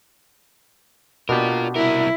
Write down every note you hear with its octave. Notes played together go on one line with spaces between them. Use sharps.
B2 D4 F4 G4 A#4
C2 E4 A#4